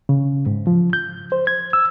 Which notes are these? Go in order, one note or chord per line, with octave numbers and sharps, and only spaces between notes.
C#3
G#2
F3
G6
C5
G#6
E6